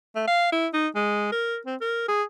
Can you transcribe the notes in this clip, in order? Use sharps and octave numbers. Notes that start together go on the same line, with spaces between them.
A3
F5
E4
D#4
G#3
A#4
C4
A#4
G#4